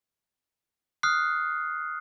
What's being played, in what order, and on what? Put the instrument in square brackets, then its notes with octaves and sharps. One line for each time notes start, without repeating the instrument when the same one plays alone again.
[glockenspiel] D#6 F6 F#6 C7